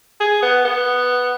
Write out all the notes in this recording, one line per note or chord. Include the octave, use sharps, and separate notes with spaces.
G#4
B3
B3